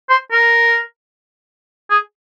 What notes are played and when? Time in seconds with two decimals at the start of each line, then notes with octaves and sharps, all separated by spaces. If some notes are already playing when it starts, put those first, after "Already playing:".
0.10 C5
0.32 A#4
1.91 G#4